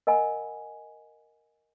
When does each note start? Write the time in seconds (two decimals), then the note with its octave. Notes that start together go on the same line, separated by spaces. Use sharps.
0.07 A#4 D#5 F#5 G#5 B5